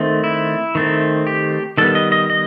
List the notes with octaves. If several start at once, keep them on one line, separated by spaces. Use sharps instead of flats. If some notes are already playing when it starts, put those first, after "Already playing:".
Already playing: D#3 A3 C4
E4
D#3 A3 C4
G4
D#3 G3 B3 A4
D#5
D#5
D#5